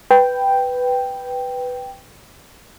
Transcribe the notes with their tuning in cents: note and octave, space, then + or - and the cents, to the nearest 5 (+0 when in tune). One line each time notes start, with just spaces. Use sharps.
B4 +5 G5 +0